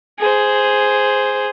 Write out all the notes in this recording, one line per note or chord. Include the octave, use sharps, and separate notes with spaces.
G#4 C5